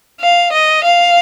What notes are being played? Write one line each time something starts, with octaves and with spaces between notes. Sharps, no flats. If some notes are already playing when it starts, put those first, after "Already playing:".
F5
D#5
F5